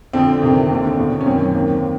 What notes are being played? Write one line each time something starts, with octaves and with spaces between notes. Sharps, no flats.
F2 D3 C4
F2 C3 D#3
D#2 D3
E2 B2
C#4
F#2 D#3 C4
D#2 D#3